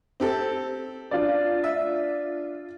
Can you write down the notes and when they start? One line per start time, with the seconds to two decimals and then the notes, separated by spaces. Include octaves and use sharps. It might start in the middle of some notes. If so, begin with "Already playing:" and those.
0.20 C4 G4 A4
1.11 D4 F4 D5
1.64 E5